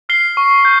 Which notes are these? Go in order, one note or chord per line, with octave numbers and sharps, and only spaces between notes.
F6 C7 G7
C#6
G6